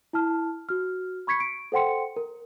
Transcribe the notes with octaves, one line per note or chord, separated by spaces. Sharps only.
E4 A5 F6
F#4 F6
B5 C#6 G#6 B6 C#7
D7
A4 C5 F#5 G5 C6 C#7
A#4